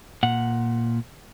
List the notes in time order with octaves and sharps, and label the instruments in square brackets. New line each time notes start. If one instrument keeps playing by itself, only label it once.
[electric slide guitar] A#2 F#5